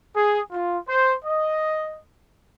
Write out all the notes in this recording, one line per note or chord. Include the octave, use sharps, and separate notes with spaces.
G#4
F4
C5
D#5